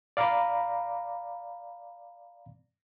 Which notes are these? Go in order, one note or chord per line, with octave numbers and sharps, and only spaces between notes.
D5 F5 A#5 B5 D6